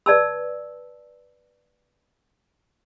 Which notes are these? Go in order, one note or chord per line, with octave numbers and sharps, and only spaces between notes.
B4 D5 A5 E6